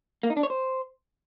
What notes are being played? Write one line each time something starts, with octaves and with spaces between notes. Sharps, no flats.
A#3
D#4
D4
C#5
C5